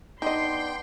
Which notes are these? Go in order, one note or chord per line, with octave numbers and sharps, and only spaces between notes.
B3 D4 D#4 D#5 G5 C6